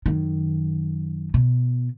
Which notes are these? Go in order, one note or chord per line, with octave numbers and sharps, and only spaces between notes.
F#2 D#3
B2